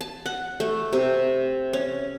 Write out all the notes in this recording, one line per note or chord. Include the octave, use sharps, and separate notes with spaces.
A5
F#5
A3
C3
C#4